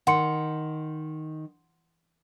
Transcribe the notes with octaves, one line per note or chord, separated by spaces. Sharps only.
D#3 F#5 C6 C#7